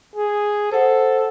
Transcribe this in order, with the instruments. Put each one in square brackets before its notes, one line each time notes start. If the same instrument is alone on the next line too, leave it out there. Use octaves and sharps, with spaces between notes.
[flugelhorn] G#4
[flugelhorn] A4 [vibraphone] C5 F#5